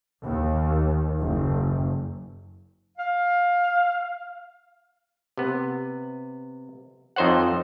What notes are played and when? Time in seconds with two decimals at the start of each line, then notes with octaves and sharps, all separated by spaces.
0.24 D#2
1.20 F#1
2.98 F5
5.37 C3 B3
7.16 F2 D#4 C5 C#5 F#5